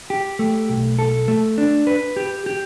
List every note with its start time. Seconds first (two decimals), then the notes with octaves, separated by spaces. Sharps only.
0.10 G4
0.39 A3
0.69 B1
0.99 A4
1.28 A3
1.58 D4
1.87 B4
2.16 G4
2.46 G4